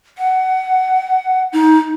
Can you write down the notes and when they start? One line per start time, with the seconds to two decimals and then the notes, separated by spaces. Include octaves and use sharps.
0.18 F#5
1.53 D#4